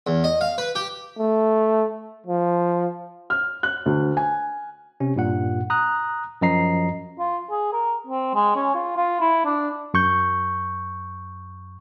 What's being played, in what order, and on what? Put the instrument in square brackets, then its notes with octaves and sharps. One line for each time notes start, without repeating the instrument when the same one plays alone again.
[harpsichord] E2
D#5
F5
B4
G4
[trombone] A3
F3
[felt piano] F6
F#6
D2
G#5
[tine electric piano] C3 C#4
G2 A#2 F#5
A#5 D#6 F#6
F#2 F3 D#5 A#5 C7
[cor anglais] F4
G#4
A#4
C4
G#3
C#4
F4
F4
E4
D4
[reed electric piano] F#2 C#6 G6